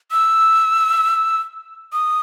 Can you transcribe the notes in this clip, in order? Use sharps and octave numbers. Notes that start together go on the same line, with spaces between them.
E6
D#6